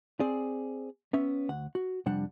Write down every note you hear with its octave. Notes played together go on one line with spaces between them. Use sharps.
C4 G#4 D5
B3 C#4 E5
D2 F#5
F#4
F2 C3 G3 D4 F#5